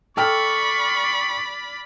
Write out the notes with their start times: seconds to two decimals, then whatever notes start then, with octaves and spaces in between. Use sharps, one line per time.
0.17 A4 D5 G5 B5 C#6 F6